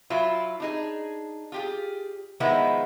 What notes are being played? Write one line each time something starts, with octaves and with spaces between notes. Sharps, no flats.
F#3 E4 F4
D4 D#4 G#4
F4 G4 G#4
D#3 F3 G#3 B3 E4 F4